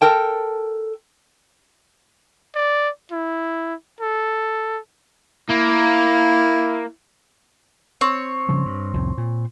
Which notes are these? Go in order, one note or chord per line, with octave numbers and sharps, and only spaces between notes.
A4 A#4 G5 A5
D5
E4
A4
A#3 E4
C4 C#5
C#3 F3 G3
G2
C2 F2 A2
A#2